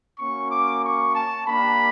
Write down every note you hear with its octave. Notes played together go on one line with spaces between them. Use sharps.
A#3 C#4 F#4 C#6
D6
C#6
A5
A#3 D4 G4 B5